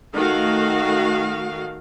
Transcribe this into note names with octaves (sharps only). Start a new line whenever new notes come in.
D#3 A3 F#4 F5